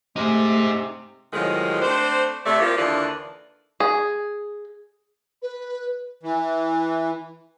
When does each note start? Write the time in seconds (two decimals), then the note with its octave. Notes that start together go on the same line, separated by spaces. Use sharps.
0.16 C3 A3 D#4 G#4
1.33 A2 C3 D#3 F3 F#3 G#3
1.82 A3 C4 D4 C5
2.46 C3 A3 D5
2.60 F3 A#3 G4
2.77 D#2 D3 E3 D4 F4
3.80 G#4
5.42 B4
6.23 E3